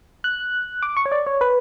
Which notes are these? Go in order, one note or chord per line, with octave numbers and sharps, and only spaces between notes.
F#6
D6
C#6
C#5
D5
C#5
B4